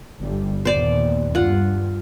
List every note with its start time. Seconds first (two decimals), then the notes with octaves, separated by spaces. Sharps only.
0.18 G1 G3
0.65 D#2 A#2 B3 C5 D5
1.35 G2 F4 F#5